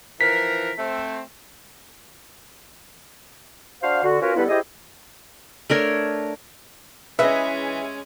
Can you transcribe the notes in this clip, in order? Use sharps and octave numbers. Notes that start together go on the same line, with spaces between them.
E3 F3 A#4 B6
A3 C4
D4 F#4 C5 F5
D3 F#4
C#4 F4 F#4 A#4 B4 C#5
D3 G3 B3 E4 A4 B4
E4 G4 G#4 C5 D#5
A3 D4 A#4 C#5
E3 G#3 C#4 G#4 B4 D#5 E5